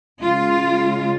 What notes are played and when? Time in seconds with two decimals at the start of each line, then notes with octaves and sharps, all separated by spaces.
0.21 C#3 G#3 F4